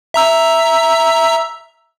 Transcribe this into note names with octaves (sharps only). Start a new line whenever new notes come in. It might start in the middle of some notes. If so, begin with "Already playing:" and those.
E5 A#5 E6